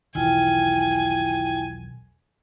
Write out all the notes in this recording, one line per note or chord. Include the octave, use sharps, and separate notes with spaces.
B1 E2 D#3 E4 F4 G5 G#5